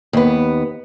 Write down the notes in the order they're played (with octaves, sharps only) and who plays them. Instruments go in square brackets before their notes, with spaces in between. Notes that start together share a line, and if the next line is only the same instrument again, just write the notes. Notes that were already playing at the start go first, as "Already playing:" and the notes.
[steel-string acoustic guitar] D#2 B3